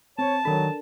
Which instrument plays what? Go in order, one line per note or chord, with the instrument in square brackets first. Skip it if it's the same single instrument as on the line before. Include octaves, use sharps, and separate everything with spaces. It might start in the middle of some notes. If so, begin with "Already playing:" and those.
[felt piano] C4 [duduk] C#5 [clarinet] A5
[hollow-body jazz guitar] D#3 B5 [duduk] F#3 [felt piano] D4 A4 A#4